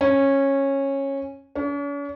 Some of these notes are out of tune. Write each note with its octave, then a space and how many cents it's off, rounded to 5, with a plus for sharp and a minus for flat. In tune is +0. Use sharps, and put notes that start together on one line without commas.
C#4 -15
C#4 +45